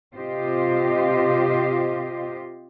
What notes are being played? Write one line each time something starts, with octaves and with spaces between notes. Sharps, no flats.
C3 F4 G4 C5 D#5